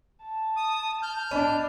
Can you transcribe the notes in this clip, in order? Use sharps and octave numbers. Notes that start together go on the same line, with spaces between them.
A5
D#6
F6 G6
B3 D4 D#5 B5